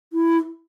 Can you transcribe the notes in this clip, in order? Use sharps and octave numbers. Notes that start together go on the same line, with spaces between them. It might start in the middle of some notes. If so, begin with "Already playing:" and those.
E4